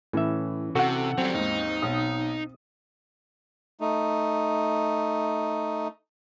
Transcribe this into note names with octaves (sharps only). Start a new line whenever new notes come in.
A2 E3 C#4 E5
C3 F#4 A4 F#5
F#3 G3 C4
D#2 G#2 D#4
B1 D#6
A3 D#4